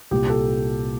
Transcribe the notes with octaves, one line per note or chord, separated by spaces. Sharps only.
C2 A#2 G4
A4